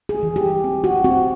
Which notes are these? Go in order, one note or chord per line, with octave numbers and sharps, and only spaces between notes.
G#4
E3
G4
C4
F#4
C4 F#4